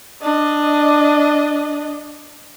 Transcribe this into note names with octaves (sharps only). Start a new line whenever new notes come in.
D4 D#5